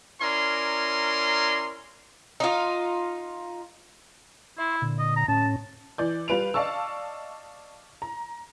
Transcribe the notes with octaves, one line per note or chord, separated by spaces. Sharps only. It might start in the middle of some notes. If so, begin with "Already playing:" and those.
C#4 E4 A#4 D5 A#5 C6
D#4 F4
E4 E5 C6
A#2 D3
D#5
A#5
A2 C#4 A5
E3 D5 G6
G3 F4 B4 D7 F7
D5 D#5 F5 A5 C#6 E6
A#5